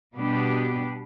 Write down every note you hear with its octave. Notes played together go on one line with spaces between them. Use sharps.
B2 G3 B3 D4 G4